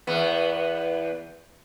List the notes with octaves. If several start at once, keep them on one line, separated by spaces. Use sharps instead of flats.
E2 B3